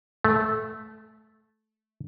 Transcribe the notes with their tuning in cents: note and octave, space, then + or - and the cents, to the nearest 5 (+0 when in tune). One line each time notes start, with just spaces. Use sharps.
A3 -15